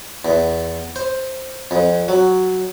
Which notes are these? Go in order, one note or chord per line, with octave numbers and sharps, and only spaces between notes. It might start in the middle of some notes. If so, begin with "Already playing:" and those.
E2
C5
F2
F#3